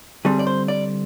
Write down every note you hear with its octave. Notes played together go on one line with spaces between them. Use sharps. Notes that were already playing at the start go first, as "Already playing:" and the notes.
D3 G3 C4 G#4
D5
C5
D5